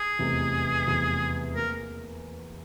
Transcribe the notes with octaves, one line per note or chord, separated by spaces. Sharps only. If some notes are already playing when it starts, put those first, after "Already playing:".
Already playing: G#4
F1 E2 C3
F1 E2 C3
A#3 A#4